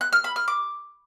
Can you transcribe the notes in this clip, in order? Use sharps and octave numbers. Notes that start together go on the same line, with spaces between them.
F#6
F6
B5
F6
D6